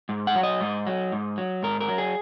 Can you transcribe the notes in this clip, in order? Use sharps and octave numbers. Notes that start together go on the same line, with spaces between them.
G#2
F#5
F#3
D#5
G#2
F#3
G#2
F#3
G#2 A#4
A#4
F#3
G#4